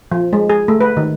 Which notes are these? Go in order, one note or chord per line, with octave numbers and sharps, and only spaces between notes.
F3
G#3
G#4
A3
B4
D#3